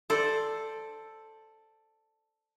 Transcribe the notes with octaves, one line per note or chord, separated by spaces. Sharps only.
A4 C5 D5